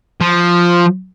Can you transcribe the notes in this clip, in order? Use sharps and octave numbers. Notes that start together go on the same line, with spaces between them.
F3